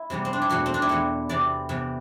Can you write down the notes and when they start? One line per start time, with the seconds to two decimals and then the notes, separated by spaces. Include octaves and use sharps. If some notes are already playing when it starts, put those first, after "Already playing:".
Already playing: E4
0.10 C3 E3 G3 B3
0.25 C4
0.33 D4
0.42 E4
0.50 E2 B2 A3 F#4
0.66 C4
0.74 D4
0.82 E4
0.89 E2 B2 A3 F#4
1.29 C3 E3 B3 D5
1.69 C3 E3 B3